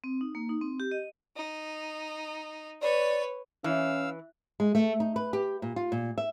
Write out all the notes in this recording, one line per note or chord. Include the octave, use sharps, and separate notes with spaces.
C4
D#4
A#3
D#4
C4
G4
D#5
D#4
B4 C#5 D5
E3 C#4 F5 E6
G#3
A3
D#4
B4
G4
A#2
F4
A#2
E5